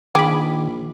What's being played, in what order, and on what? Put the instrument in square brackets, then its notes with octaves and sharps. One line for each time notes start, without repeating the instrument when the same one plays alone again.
[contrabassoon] A#1 [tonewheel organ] D#3 [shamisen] G#4 G5 [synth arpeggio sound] B5 D6